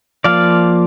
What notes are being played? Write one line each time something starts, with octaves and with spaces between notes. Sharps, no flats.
F3 A#3 D5 F5